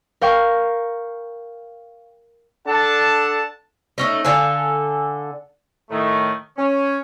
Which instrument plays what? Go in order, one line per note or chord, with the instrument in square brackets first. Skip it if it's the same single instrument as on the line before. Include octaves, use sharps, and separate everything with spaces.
[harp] A#4 F5 G5 C#6
[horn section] D4 A4 F#5 A5
[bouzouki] A3 C#4 D#4
D3 A4 F5 G#5
[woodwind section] A2 D#3 A3
C#4